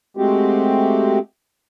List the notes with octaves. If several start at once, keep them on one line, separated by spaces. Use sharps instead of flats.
G#3 A3 C4 F#4 G4